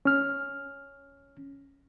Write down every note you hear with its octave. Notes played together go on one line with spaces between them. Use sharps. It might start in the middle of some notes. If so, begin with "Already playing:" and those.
C#4 F6